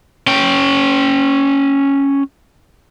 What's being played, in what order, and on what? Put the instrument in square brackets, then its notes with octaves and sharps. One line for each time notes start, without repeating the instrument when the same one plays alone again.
[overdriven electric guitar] C#4 G5